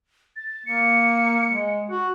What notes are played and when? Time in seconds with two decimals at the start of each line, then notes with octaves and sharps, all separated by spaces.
0.36 A6
0.66 A#3 C#7
1.49 G#3
1.91 F#4